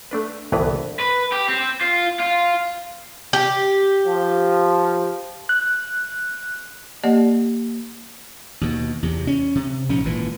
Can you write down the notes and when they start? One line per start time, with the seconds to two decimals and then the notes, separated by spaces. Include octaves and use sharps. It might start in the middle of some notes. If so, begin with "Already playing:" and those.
0.11 A3 D4 B4
0.52 G1 C2 A2 E3 B3 B4
1.00 B4
1.32 G4
1.48 C4
1.81 F4
2.20 F4
3.33 G4
4.07 F3
5.49 F#6
7.04 A#3 G4 D5 D#5 F#5
8.61 D#2 B2
9.03 E2 C3
9.27 C#4
9.55 C3
9.89 A#1 G#2 C#4
10.05 G#1 A#2 E3